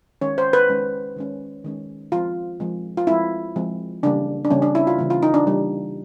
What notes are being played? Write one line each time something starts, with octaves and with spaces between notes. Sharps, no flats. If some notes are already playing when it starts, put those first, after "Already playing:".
D#3 G#3 C#4 C#5
C5
B4
D#3 G#3 C#4
D#3 G#3 C#4
D#3 G#3 C#4
F3 G#3 C4 F4
F3 G#3 C4
F4
F3 G#3 C4 E4
F3 G#3 C4
C#3 E3 G3 A#3 D4
D4
C#3 E3 G3 A#3 C#4
D4
E4
F4
C#3 E3 G3 A#3
F4
D#4
D4
C#3 E3 G3 A#3